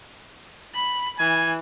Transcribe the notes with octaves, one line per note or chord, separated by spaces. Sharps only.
B5
E3 G#5